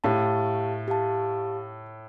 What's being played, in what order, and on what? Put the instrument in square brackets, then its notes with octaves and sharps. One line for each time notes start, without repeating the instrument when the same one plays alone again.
[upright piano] A2 [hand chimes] G4 F5 A5
[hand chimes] G4 F5 A5